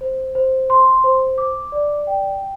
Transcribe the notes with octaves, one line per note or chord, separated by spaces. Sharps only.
C5
C5
C6
C5
D6
D5
G5